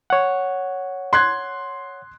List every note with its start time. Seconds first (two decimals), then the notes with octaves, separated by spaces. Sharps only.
0.10 C#5 F#5
1.13 C6 F#6 G#6